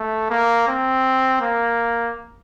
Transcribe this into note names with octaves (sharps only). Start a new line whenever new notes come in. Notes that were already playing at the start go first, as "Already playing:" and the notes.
Already playing: A3
A#3
C4
A#3